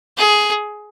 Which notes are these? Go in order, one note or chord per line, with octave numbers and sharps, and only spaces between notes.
G#4